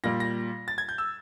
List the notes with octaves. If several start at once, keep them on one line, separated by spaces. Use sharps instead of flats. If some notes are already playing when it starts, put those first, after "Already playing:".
A#2 G3 A#6
A#6
A6
G#6
G6
E6